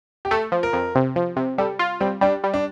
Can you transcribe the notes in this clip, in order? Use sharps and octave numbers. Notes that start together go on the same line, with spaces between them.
G4
A3 A4
F3
A#4
F2
C3
F3
C3
G3 A4
F4
G3 C4
G3 D4
G3
D4